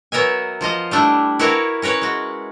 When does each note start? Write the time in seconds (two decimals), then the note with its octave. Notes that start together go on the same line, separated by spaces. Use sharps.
0.12 F#3 B3 A#4 E5 G#5
0.61 F3 F4 D#5 F5
0.91 G3 A3 D4 E4
1.39 E4 F#4 A#4 B4 C#5
1.82 C#4 A#4 B4 C#5
2.02 G#3 F#4